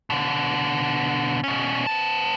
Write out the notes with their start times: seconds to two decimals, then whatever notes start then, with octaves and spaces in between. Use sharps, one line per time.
0.10 B2 D3
1.44 B2 C#4
1.86 B3 A5